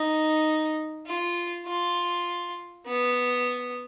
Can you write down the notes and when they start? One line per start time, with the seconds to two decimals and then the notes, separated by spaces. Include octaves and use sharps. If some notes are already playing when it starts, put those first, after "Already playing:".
Already playing: D#4
1.07 F4
1.66 F4
2.87 B3